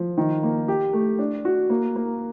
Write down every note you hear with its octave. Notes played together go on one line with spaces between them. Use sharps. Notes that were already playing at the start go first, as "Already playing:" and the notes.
Already playing: F3
D#3
A#3
G4
A3
D4
F#4
A#3
A#3